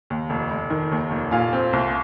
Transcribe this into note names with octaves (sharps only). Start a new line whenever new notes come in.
D#2
F1
F1
D#3
D#2
F1
A#2 F5 G#5
C4
C2